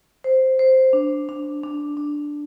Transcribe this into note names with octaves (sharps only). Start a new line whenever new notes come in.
C5
C5
D4
D4
D4
D4